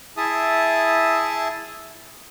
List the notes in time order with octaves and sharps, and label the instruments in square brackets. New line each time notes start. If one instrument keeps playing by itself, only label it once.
[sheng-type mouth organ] E4 G#4 E5 A5 D#6